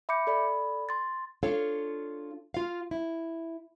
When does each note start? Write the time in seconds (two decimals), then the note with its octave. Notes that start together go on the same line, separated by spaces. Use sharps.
0.09 E5 B5 D6 G6 C#7
0.27 A4 D5 B5
0.89 C6 A6
1.43 D4 F4 A4 C#5 F5
2.54 F4 F5
2.91 E4